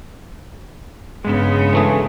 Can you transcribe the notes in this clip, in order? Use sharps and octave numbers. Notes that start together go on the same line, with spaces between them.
G2 C#3 G#3 B3
E3 A3 G#4